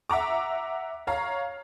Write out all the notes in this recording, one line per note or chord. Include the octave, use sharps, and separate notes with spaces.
E5 F#5 A#5 D6
C#5 F5 A#5